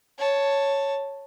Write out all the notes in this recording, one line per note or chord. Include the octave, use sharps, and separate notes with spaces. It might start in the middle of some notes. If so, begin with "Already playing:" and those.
C#5 A5